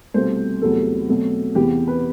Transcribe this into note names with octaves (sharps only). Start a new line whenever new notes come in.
C2 B2 A3 C4 C5
E2 C3 F#3 A3 A4
B2 F#3 A3 C4
E2 C3 E3 B3 G4
B4